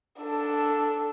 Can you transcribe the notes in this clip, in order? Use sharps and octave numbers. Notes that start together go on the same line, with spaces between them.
D4 A4